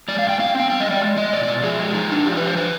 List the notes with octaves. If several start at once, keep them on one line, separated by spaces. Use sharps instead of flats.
G#3 D5
F5
G2
G5
C4 F5
C4 G5
G3 G5
D#5
G3 D5
G#3
G#3 D#5
B2 D5
B2 D5
F3 G#4
G#3
F3 D#4
F3 D4
F3 G4
F3 B4
C5
D3 B4